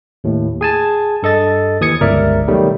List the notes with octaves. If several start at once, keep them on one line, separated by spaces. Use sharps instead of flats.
D#2 A2
G#4 G#5 A5
G2 A4 D#5 A6
D#2 E3 D#6 G#6 C#7
G1 C#2 A#4 D5 E5
B2 D#3 F#3 G3 A3